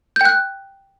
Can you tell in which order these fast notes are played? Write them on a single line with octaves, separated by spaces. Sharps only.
G6 G5 F#6